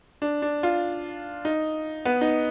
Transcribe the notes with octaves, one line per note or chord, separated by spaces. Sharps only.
D4
D4
F4
D#4
B3
D#4